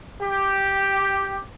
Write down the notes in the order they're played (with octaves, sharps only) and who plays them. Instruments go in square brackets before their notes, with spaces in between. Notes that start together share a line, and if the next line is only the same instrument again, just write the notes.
[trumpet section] G4